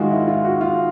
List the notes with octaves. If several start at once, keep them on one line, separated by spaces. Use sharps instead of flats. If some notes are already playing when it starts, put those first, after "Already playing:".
Already playing: G#2 D#3 G#3 F4 F#4
E4
F4
F#4
F4